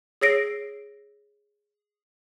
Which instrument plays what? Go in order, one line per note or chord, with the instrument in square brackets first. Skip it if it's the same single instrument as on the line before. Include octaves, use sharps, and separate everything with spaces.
[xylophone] G#4 C#5 E6 A#6 C7 D7